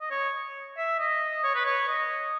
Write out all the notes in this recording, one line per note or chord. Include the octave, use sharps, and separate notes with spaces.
D#5
C#5
E5
D#5
C#5
B4
C#5
D#5